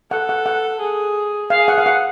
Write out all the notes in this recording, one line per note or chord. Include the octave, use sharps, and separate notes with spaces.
A4 F#5
F#5
F#5
G#4
G#4 F5
F#5
F5
F#5